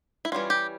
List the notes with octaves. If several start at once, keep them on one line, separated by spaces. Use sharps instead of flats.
E4
E3 G3 C#4 F4
G4